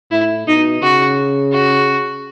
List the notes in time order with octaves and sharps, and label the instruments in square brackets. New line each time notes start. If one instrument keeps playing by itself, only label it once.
[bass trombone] A2 [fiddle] E4
[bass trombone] B2 [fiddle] D#4
[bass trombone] C#3 [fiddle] F#4
[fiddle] F#4